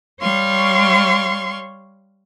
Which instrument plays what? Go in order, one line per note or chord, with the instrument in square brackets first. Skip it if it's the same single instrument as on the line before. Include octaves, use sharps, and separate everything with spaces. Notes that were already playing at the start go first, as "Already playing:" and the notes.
[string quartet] G3 C#5 F5 C6 C#6